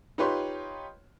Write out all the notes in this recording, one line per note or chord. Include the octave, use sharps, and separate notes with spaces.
D#4 F4 G4 B4 C#5 C6